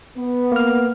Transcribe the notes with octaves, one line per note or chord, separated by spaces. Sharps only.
B3
A#3 F6